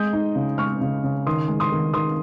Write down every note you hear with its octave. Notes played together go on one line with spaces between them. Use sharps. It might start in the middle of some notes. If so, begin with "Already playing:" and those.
Already playing: G#3 D#6 G6
D#4
C#3
G#3 C#6 F6
C#3
C#3
D#3 C6 D#6
G#3
C6 D#6
D#3
D#3 C6 D#6